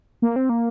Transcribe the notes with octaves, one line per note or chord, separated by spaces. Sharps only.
A#3
C4
A#3